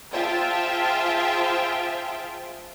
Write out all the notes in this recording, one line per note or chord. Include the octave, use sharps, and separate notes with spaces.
F4 G#4 C5 E5 G5 A5